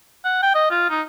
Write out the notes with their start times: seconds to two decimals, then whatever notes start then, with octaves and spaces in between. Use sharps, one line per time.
0.25 F#5
0.43 G5
0.55 D#5
0.71 F4
0.90 D#4